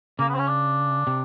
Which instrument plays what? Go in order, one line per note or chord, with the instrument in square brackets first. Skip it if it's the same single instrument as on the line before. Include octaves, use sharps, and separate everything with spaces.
[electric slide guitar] C#3 [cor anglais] A#3
[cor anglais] B3
C4
C#4
D4
[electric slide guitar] C3